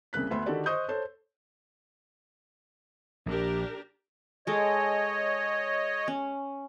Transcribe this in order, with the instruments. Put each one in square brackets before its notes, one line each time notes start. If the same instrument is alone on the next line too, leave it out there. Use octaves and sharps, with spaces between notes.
[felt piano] C2 C#3 A#3 F#6 B6
D2 B3 E5 C6
D3 D#3 F#4 G4 A4 D5
C5 D#5 C#6 D#6 G6
A4 C5 C#5
[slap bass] A#1 [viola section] D4 G4 A#4
[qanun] G#3 A4 [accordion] C#5 D#5
[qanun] C#4